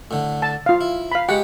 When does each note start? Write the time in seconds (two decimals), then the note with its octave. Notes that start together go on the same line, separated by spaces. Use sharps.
0.11 A2 D3
0.42 A5
0.66 F4 F5
0.81 E4
1.12 F5 B5
1.29 G#3 G4 F#5